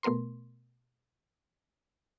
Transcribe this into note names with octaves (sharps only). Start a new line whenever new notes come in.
B2 A3 B3 A#4 C6